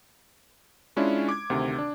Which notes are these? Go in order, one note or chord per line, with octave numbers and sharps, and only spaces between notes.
G#3 C#4 D4 E4 F4
D6 G#6
D2 C3 D#3
D4